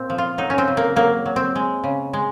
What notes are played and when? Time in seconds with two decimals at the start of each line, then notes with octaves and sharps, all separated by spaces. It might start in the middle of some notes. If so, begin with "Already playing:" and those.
Already playing: A#2 C4
0.10 F3
0.18 F4
0.38 F#3 D#4
0.50 C#4
0.58 C4
0.68 C#3
0.77 A#3
0.96 F#3 A#3
1.26 F#3
1.36 C4
1.55 G#3
1.84 C#3
2.13 G#3